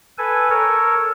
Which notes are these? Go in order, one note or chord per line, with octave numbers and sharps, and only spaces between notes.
A4 B4 G#5
A4 A#4 C#5